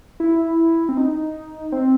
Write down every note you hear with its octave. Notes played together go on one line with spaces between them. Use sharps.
E4
C4
D#4
C4